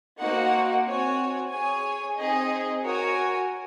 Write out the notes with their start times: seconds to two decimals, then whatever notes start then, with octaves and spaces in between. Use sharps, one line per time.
0.19 A#3 D#4 F#4 C5 F#5
0.85 C4 F#4 C#5 G#5
1.51 G#4 C#5 G#5
2.17 C4 D#4 G#4 D#5
2.83 F#4 A#4 C#5 G#5